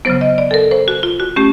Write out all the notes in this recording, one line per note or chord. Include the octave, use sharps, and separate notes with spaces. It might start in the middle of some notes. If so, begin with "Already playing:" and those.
C#3 F#3 B3 C5
D#5
D5
A4
A#4
C5
F#4
F4
F#4
A3 C#4 G4